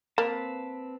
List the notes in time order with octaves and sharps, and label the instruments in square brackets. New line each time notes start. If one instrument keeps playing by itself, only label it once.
[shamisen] A#3 [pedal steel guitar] C4 B4 A5